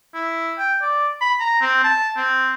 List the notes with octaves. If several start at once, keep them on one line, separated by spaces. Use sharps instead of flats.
E4
G5
D5
B5
A#5
C4
A5
C4